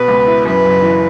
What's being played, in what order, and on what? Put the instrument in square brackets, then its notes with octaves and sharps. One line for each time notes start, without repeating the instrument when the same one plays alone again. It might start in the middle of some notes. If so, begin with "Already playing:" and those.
Already playing: [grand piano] B2 [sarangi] B4
[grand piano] C#2
E4
[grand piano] F#2 [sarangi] B4
[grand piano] F#1
E3